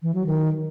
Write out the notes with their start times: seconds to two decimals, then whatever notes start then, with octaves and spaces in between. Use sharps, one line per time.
0.02 E3
0.14 F#3
0.26 D#3